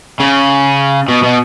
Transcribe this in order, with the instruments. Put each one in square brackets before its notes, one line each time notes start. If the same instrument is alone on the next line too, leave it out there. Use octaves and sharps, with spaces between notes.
[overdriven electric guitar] C#3
B2
B2